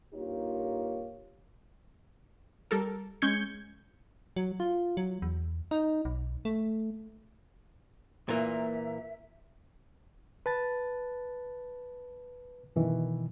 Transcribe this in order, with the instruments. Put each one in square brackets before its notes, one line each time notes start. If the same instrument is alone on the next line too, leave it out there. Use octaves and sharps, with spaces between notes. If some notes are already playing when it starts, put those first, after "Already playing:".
[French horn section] G2 A#3 D#4 F4 G4 C#5
[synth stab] G3 A4 A#4
G#3 C#4 G6 G#6 C#7
[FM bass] F#3
F4
F#3
E2
D#4
B1
A3
[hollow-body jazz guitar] A#2 E3 A#3 [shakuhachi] E5
[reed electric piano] B4 A5 A6
F#2 B2 D#3 E3